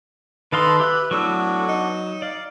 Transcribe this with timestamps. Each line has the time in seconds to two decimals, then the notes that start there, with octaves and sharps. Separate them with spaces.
0.52 D#3 A4 B4 D#5 F5 A5 C6
0.80 G4 E5 F#6
1.11 A2 F#3 B3 D4 F#4 E6
1.68 D#4
2.22 D5 F5